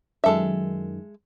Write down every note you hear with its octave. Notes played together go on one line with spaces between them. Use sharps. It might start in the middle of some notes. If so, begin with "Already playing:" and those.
F#2 D#3 G#3 A4 E5